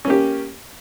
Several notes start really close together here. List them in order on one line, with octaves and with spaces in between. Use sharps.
C#4 A#3 G4